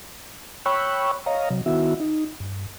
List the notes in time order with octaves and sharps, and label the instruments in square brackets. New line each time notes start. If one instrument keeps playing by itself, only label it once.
[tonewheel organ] C#5 G5 B5 C#6 E6 F#6
C#5 D#5 F5 A#5
C3 F#3
D#3 B3 E4 F#4 E5
D#4
G2